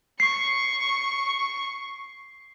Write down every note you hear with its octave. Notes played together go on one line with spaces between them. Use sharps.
C#6 C7